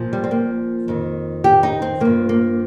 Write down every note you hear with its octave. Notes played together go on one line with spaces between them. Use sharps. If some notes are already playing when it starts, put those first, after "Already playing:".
Already playing: A#2 F3
G3
C4
A#3
F2 D#3
G4
D#4
C4
G2 F3 A#3
A#3